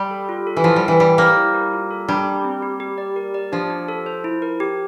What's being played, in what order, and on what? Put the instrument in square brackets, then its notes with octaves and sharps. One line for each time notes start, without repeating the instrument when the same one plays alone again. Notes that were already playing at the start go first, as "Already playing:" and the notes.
Already playing: [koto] G3
[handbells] A4
F4
A4
[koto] E3
[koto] F3 [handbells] E4
[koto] G3
[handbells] A#4
[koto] E3
[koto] G3 [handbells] G4
[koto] A#3 [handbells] C5
[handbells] E4
A#4
F4
A4
[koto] G3 [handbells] D4
[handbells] G4
C4
G4
G4
D5
A#4
D5
[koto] F3 [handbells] D4
[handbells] G4
A4
C5
E4
A#4
G4